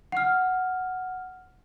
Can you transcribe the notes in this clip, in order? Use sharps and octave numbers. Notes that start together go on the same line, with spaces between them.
F#5 F6